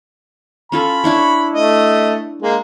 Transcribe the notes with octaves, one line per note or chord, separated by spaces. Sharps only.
C#4 F4 A4 B5
D4 E4 C#5
A3 D#5
G#3 A#3